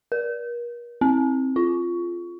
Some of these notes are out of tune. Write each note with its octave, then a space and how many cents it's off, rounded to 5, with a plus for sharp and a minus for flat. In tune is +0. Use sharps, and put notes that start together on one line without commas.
A#4 +40
C4 +15
F4 -10